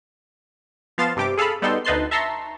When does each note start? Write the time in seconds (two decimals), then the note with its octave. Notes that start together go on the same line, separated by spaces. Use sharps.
0.98 F3 B3 F5 C6 A6 E7
1.16 G2 C3 G4 D6
1.37 G#4 A4 F5 A5 B5
1.62 G3 B3 D#4 A4 G5 C6
1.85 D2 D#4 B4 A5 C6 C7
2.11 E5 A5 A#5 C6 C#6 E6